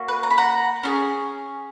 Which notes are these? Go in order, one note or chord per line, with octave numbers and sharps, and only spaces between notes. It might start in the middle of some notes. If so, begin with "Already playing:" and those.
Already playing: A#3 C#4 F#4
B4
A#5
B5
F#5 A#5
C#4 F4 G#4